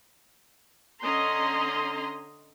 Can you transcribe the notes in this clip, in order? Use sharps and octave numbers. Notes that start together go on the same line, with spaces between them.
D3 C#4 D#5 A#5 C6